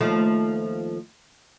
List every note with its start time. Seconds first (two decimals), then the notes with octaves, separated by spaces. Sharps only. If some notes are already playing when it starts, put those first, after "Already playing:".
0.01 D#2 F3 A3